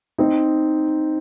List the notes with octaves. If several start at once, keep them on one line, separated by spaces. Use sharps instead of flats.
C4 D#4